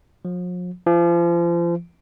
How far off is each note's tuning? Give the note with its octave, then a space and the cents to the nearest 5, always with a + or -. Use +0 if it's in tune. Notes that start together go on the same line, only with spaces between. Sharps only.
F3 +45
F3 -35